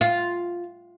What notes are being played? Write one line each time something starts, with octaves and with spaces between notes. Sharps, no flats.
F4